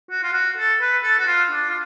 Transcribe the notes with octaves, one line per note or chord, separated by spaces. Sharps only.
F#4
F4
F#4
A4
B4
A4
F#4
F4
D4
F4